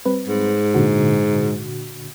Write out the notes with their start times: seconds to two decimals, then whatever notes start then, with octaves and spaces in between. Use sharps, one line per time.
0.06 G3 C4 B4
0.28 G#2
0.74 A#2 D3 F#4